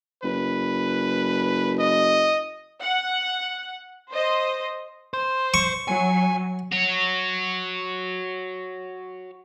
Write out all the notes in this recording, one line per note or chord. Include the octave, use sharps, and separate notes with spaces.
F#1 B4
D#5
F#5
C5 D#5
C5
C#6
F#3 G#5
F#4 C#5